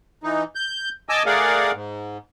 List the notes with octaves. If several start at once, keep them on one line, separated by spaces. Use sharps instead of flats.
E3 D#4
G6
D#5 G#5 A5 D6 E6
A3 G#4 A#4 D5 F5 F#5
G#2